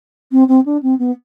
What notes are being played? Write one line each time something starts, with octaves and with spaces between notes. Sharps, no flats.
C4
C4
D4
C4
B3